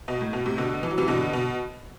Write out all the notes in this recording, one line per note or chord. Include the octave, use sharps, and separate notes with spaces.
B2
A2
B2
A2 C3
B2 D3
E3
F#3
C3 E3
B2 D3
B2